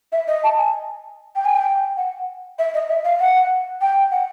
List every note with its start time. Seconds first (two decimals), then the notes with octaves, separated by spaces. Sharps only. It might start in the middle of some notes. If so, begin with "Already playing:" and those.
0.12 E5
0.27 D#5
0.43 A5
0.58 G#5
1.35 G5
1.45 G#5
1.56 G5
1.96 F#5
2.58 E5
2.74 D#5
2.89 E5
3.04 F5
3.19 F#5
3.81 G5
4.11 F#5